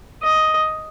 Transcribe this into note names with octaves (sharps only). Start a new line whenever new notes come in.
D#5